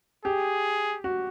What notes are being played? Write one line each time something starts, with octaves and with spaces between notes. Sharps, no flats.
G4 G#4
F#4